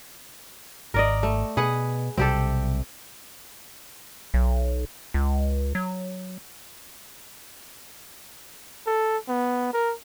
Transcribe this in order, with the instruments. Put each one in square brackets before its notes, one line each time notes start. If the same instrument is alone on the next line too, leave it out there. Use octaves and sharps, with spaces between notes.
[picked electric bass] G#1 [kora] A#4 D5 D#5
[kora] A3
[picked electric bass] B2 [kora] G#4 B4 F#5
[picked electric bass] B1 C3 G3 [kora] C4 G4 A4
[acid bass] B1
C#2
F#3
[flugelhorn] A4
B3
A#4